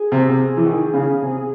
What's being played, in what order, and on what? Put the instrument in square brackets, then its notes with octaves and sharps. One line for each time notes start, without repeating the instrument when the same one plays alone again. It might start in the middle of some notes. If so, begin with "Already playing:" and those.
Already playing: [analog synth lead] G#4
[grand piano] C3
C3
E3
D#3
C#3
C3